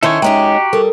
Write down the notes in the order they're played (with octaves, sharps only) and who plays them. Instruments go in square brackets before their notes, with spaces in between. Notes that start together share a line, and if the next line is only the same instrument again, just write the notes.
[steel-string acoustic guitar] D#3 C#4 E4 [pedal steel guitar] A4 C5 C#5 [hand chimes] E5
[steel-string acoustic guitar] G#3 C#4 D#4 [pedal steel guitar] F#4 G4 [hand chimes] G5 A#5
[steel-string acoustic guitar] G3 [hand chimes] A4 A#4